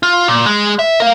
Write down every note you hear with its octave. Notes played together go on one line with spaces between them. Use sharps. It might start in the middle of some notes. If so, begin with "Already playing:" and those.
F4
A#2
G#3
E5
A#4 F5